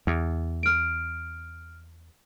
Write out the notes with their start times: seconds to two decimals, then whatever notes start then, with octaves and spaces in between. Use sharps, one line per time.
0.07 E2
0.63 F6 D7